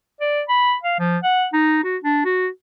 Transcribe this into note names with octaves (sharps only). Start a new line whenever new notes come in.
D5
B5
F5
F3
F#5
D#4
F#4
D4
F#4